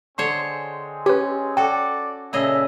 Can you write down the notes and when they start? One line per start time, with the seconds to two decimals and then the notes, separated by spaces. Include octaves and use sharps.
0.18 D3 G#3 C4 G#4 C5 C#5 C6
1.06 C#4 G4 B4
1.57 F#4 A4 D5 G5
2.33 A#2 C#3 A4 D#5 E5